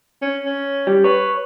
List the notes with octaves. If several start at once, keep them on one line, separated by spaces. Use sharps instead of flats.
C#4
C#4
G3
B4 C#5